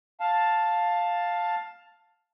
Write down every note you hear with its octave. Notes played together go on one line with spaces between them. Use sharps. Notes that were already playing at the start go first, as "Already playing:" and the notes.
F5 A5